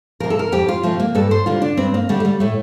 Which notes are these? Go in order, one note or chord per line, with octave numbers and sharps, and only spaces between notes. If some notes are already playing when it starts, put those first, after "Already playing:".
C3 F3 A#4
A4
A#4
F2 G4
F4
C3 F3 A3
A#3
G2 A4
C5
D3 G3 F4
D4
G2 C4
A#3
D3 G3 A3
A3
G3
A2 A3